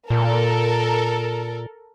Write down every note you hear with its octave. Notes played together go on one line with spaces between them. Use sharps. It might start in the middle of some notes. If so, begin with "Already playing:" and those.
A#2 A4 A#4